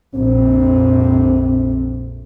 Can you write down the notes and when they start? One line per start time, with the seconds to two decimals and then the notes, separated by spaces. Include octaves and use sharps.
0.14 A#1 F2 C3 C4